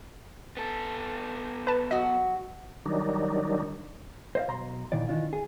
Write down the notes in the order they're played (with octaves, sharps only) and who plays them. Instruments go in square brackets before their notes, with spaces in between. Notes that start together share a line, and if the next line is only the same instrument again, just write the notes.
[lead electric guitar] B3 A4
[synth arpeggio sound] B4 A5
[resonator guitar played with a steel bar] F#3 F#4 [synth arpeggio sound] D#5
[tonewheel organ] D#3 F#3 G3 D4 D#4
[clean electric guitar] C5 D#5 F5
B1 A#5 C6
A#2 D#3 E3 D5
D#3 E3 D4 F4
G#4